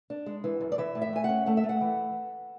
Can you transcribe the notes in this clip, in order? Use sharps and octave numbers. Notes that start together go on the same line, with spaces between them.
D4
G#3
E3
F#2
D5
E3 E5
A2
E5
A3 G#5
C#4 F#5
A3 F#5
E5
A3
F#5
E3